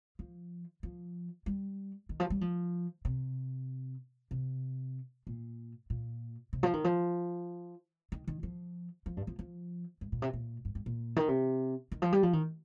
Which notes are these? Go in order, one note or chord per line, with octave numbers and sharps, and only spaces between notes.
F3
F3
G3
D#3
F3
G3
F3
C3
C3
A#2
A#2
C3
F3
D#3
F3
D#3
D#3
F3
F3
G2
F3
F3
G2
A#2
C3
A#2
G2
G2
A#2
D#3
C3
D#3
F3
G3
F3
D#3